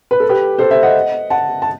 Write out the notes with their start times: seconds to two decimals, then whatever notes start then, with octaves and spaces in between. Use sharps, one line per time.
0.11 B4
0.20 A4
0.29 G4 B4
0.58 A4 C5
0.71 C5 E5
0.83 D#5 F#5
1.30 F#5 A5
1.62 A5